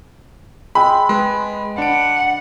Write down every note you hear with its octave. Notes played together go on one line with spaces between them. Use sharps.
G#3 C4 B5
G#3 B4
D4 F#5 D7